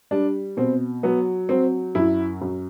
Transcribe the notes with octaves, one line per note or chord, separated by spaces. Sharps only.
G3 D4
B2 C4
F#3 B3
F#3 C4
F#2 E4
F#2